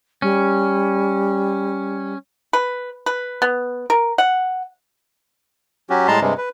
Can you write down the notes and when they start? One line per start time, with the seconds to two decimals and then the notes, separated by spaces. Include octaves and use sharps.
0.22 G3 C#4
2.53 B4
3.06 B4
3.42 B3
3.90 A#4
4.18 F#5
5.90 F#3 C#4 F#4 G4
6.08 A2 G3 G#3 A5 A#5 C6
6.21 G2 C3 G3 G#3
6.37 B4